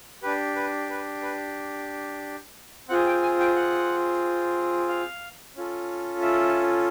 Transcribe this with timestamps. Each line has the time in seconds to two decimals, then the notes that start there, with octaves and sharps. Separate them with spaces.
0.23 D4 G4 B4
0.56 B4
0.90 B4
1.22 B4
2.89 C4 F4 G#4 F#5
3.06 G5
3.22 G#5
3.40 G5
3.56 F#5
4.89 F5
5.56 C#4 F4 A4
6.22 E5